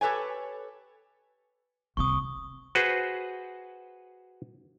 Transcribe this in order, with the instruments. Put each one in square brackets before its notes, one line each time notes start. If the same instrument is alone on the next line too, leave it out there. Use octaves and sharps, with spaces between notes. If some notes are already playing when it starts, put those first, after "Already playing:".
[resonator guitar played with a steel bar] G4 A4 B4 C#5 G#5
[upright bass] C2 C4 [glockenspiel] C#6 D#6
[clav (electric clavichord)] F#4 G#4 B4 C5